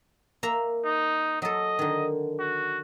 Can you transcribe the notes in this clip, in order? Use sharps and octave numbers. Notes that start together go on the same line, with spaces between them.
A#3 E5 A#5
D#4
F#3 A4 D#5
D3 D#3
F#4